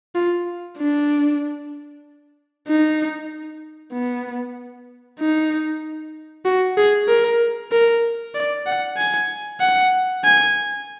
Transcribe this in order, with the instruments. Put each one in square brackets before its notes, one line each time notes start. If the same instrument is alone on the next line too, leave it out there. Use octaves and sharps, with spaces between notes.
[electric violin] F4
D4
D#4
B3
D#4
F#4
G#4
A#4
A#4
D5
F#5
G#5
F#5
G#5